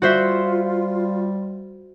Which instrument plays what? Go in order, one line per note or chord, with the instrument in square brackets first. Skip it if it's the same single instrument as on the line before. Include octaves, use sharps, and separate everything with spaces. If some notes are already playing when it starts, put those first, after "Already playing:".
[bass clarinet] G3 [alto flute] F4 [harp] F#4 C5 E5